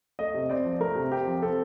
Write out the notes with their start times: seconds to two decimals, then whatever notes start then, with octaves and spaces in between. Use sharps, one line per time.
0.19 A3 D#5
0.34 C3
0.49 C4 D5
0.65 F3
0.80 A3 A#4
0.96 C3
1.11 C4 G4
1.27 F3
1.42 C4 A4